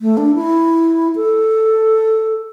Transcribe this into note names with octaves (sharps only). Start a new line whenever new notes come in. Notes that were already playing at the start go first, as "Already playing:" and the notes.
A3
D4
E4
A4